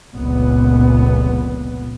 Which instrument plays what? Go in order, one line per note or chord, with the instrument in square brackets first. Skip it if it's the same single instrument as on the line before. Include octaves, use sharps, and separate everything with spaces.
[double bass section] F1 C#2 A#2 B3